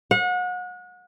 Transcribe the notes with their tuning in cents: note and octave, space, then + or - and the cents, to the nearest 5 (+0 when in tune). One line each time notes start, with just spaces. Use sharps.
F#5 -35